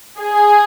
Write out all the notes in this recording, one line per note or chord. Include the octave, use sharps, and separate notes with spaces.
G#4